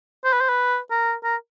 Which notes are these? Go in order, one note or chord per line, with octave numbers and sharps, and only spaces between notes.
C5
B4
C5
B4
A#4
A#4